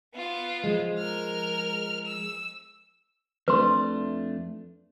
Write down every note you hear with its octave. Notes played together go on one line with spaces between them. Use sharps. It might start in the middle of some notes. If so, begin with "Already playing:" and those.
B3 F4
F3 G#3
A#4 F6
E6
F2 A3 D4 B4 C6